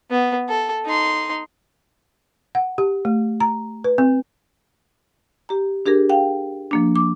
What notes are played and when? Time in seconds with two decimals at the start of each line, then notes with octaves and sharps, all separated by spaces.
0.10 B3
0.48 A4
0.85 D#4 C6
2.55 F#5
2.78 G4
3.05 A3
3.40 A#5
3.84 B4
3.98 C4
5.49 G4 A#5
5.86 D4 G4 G#4 A#4
6.10 F5 G5
6.71 F3 A#3 D4
6.96 D6